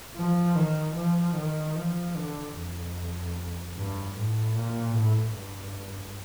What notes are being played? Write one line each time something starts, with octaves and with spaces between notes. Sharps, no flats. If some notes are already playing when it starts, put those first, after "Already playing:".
F3
D#3
F3
D#3
F3
D3
F2
G2
A2
A#2
A2
G2